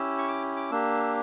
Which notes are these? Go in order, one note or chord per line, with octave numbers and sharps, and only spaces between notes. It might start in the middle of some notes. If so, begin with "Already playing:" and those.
Already playing: C#4 E4 G4 E6
C#6
D6
D6
A#3 D4 G4 E6
E6